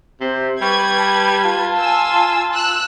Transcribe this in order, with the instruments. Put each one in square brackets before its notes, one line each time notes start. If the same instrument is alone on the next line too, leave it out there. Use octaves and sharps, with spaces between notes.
[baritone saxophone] C3 [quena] C5
[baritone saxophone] G3 [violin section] B4 G#6 [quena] C#6
[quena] A5
[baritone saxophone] F4
[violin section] G#5 E6
E6 F#6